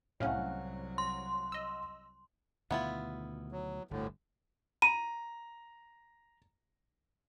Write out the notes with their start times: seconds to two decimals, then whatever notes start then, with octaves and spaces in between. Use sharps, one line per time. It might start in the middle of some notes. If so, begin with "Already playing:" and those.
0.20 C2 A2 F#3 A3 C#4 F5 F#5
0.98 C6
1.52 D#5 E6
2.71 D2 B2 D#3 B3 E4 F4
3.52 F#3
3.91 G1 D2 A2 D3
4.82 A#5 D#7